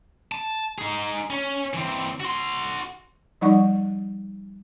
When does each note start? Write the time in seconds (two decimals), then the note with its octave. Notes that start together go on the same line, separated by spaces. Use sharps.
0.32 A5
0.78 D#4 G#4
1.30 C#4
1.74 E3 C4
2.20 F#4 C6
3.41 F3 G3 D#4 D5 F#5 C#6